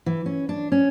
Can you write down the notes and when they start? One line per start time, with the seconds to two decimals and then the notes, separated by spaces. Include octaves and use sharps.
0.06 E3
0.26 C#4
0.49 D4
0.72 C#4